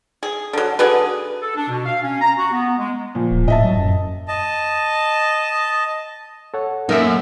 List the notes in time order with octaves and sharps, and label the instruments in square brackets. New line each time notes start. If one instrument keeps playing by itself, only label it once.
[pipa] G#4
D3 F#3
D3 F#3 G#4 B4
[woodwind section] A4
D4
B2
F5
C#4
A#5
F#4
B3
G#3
[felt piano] A#2 F3
[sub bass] D1
[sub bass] A2 [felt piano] D#5 E5 A5
[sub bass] F#3
F#2
[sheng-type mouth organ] D#5 A5
[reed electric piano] A4 C#5 F#5
[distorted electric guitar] F#2 [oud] A#3 [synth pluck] D#4 A#4 E5